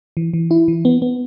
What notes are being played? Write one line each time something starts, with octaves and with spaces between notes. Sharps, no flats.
E3
E3
E4
E3
B3
B3